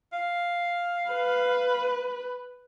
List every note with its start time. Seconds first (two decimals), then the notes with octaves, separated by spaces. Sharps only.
0.13 F5
1.11 B4